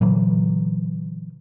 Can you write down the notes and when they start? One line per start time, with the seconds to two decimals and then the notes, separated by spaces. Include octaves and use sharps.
0.01 A#2 D3 E3 F#3